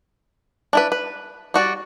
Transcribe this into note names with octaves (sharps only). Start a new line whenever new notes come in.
D4 E4 B4
B4
G3 F#4 D5